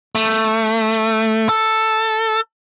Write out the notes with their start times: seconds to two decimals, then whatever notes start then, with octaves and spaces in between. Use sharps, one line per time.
0.15 A3
1.49 A4